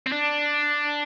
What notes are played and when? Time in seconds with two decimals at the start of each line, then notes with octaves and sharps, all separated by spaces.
0.06 C4
0.12 D4